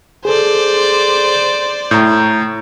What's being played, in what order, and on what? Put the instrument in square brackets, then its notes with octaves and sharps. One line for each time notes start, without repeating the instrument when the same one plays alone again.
[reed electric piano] G#4 A4 [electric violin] C5 D5
[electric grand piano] A2 [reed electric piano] A#5 G6